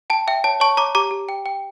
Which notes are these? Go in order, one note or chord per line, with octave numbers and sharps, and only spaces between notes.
G5 A5
E5 G5
C#5 A5
C#5 A5 C#6
C#5 A#5 D6
G4 A#5 D6
G4
G5
G5